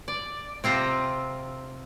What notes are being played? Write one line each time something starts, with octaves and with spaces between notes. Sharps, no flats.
D5
C3 C4 F4 A#5